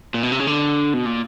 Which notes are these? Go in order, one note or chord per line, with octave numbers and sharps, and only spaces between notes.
A#2
B2
C3
C#3
D3
B2
A#2